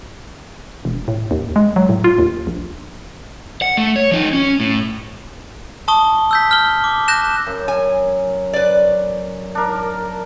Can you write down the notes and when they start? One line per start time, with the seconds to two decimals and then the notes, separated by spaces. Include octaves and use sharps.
0.85 E1
1.08 A2
1.31 D#2
1.56 G#3
1.76 F#3
1.89 A2
2.04 F4
2.18 D#2
2.47 A#1
3.62 F#5
3.77 A3
3.96 C#5
4.11 F3 D#4
4.33 C#4
4.60 A2
5.88 A5 C#6 D#6 G7
6.31 E6 G6 B6
6.51 F6 G7
6.84 D6
7.08 F#6 G6 A#6 E7
7.47 F#2
7.68 G#5
8.53 B4 D5
9.55 D4 A#4